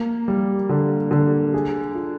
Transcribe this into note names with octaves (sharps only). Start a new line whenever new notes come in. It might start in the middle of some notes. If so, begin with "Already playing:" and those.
Already playing: A#3
G3
D3
D3
G#4
F4